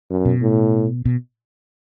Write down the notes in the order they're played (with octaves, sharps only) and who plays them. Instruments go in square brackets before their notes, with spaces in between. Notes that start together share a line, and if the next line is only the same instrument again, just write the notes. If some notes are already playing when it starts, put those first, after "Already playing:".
[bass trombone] F#2
[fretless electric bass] B2
[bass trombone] A2
[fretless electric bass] B2